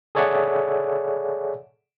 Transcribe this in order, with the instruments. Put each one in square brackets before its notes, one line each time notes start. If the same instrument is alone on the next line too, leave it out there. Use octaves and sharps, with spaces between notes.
[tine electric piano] G#4 A4 C#5 D5 E5 F#5